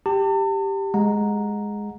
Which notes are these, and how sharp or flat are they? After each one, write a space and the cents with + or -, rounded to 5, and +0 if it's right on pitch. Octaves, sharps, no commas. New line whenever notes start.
G4 +0 A5 +40
G#3 +0 F#5 -20 A#5 +0